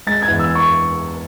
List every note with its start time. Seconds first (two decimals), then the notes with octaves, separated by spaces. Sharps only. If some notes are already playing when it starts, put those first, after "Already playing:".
0.07 G#3 A6
0.22 G#6
0.28 E2
0.39 E6
0.55 C#6